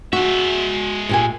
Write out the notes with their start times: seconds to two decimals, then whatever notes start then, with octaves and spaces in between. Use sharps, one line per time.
0.13 G#3 F#4 E5
1.09 A#2 G4 G#5